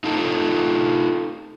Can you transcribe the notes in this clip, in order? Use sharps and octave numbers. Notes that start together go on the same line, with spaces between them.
D#4 F4 A4